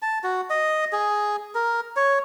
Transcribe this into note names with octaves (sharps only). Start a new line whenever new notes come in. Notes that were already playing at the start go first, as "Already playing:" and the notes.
A5
F#4
D#5
G#4
A#4
C#5